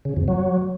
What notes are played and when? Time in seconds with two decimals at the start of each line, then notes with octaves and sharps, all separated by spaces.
0.05 C#3
0.17 F2
0.28 F#3